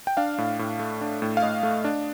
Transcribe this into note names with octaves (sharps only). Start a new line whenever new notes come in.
G5
D4 F5
A2
A2
A3
D4
A2
F5
A2 D#5
A3
D4